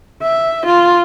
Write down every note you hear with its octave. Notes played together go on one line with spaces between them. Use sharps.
E5
F4